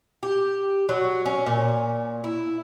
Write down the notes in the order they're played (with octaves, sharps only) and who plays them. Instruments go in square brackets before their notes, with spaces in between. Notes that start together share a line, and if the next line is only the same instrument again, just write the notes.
[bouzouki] G4
F#3
C#4
A#2
E4